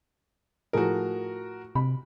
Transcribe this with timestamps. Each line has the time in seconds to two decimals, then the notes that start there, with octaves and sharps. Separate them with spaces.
0.73 A2 F3 F#4 G#4 A#4
1.75 C3 B5